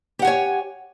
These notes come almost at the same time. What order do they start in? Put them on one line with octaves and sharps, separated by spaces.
G4 F#5 G#5 C#5